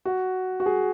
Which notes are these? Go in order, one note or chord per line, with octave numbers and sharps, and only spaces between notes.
F#4
F#4
G#4